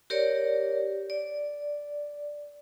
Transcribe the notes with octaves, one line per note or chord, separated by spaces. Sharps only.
G4 A#4 C#5 D5
D5